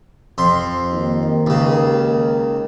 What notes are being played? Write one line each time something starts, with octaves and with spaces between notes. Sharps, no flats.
F2 C6
D#2 D#3
C#2 C#3